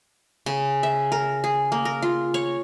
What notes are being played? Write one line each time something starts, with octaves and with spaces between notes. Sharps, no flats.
C#3
E5
A#4
G#4
A#3
A#4
F4
C#5